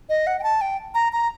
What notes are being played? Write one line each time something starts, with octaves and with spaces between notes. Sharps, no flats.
D#5
F#5
G5
A5
G5
A#5
A#5